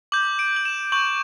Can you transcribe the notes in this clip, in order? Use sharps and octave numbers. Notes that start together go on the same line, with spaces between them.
D6 G6 F#7
D7
F#7
E7
C#6 G6 F#7